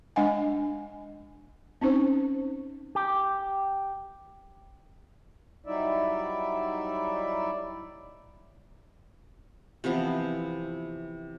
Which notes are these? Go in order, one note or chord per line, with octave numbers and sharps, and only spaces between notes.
G#3 D4 D#5 F#5 G#5
C4 C#4 D#4 C5
G4
F#3 G3 D#4 E4 D5 E5
C3 E3 F3 B3